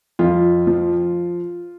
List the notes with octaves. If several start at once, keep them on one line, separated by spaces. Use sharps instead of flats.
F2 F4
F3